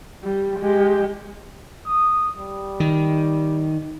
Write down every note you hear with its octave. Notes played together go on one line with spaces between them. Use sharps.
G3
G#3 G4
D#6
G3
D#3